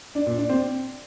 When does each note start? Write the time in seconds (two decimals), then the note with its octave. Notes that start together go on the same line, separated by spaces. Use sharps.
0.15 D4
0.26 A#2
0.38 D4
0.49 C4